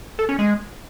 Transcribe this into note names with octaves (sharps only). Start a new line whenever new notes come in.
A4
C#4
G#3